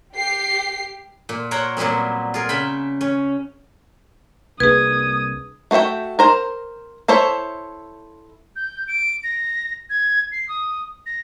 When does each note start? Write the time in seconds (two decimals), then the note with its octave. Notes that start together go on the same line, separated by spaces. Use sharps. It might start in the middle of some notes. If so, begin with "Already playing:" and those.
0.16 G4 C7
1.29 A#2
1.51 A#4 C5 C#5 F#5 G5 A#5
1.77 A#2 F#3 G3 B3 C4
2.34 F4 G#4 A#4
2.49 C#3 E5 G5 B5
3.01 C#4
4.60 C2 A#3 D4 G#4 B4 D#6 G#6
5.71 A3 F#4 C5 E5 G5
6.19 A#4 C5 A#5
7.08 E4 A4 C5 C#5 E5
8.56 G6
8.88 D7
9.24 A#6
9.90 G#6
10.32 C7
10.49 D#6
11.06 A#6